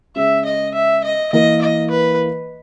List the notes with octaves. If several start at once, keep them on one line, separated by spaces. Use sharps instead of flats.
C#3 G#3 C#4 E5
D#5
E5
D#5
E3 A#3 E4 A#4 D#5
D#5
B4